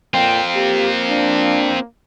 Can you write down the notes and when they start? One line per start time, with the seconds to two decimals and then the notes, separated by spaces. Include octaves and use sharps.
0.14 A#2 C4 F4 G5
0.55 A#3 G4
1.10 D4